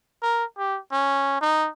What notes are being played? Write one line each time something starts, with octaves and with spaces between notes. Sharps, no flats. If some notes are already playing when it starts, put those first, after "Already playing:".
A#4
G4
C#4
D#4